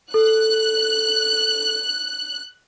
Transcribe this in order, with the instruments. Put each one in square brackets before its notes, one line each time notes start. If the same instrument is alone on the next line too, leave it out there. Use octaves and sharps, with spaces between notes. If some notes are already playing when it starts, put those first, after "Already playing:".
[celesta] A4 [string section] F#6